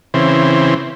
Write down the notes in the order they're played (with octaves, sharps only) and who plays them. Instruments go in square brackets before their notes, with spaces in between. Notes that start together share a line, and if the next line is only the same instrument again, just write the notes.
[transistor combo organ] C#3 E3 C4